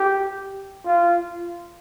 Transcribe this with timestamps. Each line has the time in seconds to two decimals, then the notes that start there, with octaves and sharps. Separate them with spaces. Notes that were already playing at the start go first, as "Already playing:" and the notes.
Already playing: G4
0.85 F4